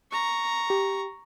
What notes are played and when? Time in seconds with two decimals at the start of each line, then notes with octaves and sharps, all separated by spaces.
0.11 A#5 C#6
0.70 G4